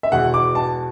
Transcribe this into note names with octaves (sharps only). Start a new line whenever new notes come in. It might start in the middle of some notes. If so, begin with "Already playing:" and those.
E5
E2 B2 G#3 F#5
D6
A5